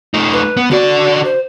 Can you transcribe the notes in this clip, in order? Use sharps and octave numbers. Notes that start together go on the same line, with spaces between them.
A3 D#4
B4
B3
D3 F#4 D5
C5